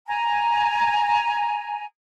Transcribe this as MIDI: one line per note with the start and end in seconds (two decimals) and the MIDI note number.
0.08 1.85 80
0.08 1.85 82